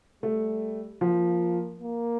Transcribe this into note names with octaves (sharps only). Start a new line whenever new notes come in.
G3 A3
F3 A#3
A#3